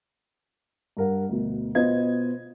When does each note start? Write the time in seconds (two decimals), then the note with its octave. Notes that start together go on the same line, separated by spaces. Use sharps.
0.97 G2 A#4 F#5
1.29 D2 B2
1.75 B2 B3 F4 C5 D#5 G#6